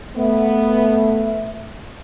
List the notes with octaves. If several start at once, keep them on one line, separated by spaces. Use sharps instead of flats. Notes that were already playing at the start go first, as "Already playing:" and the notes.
A3 B3 E5